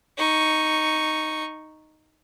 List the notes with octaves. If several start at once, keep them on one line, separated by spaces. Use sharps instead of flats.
D#4 C#6